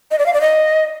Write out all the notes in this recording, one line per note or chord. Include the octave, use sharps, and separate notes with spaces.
D#5
D5
F5
D5
D#5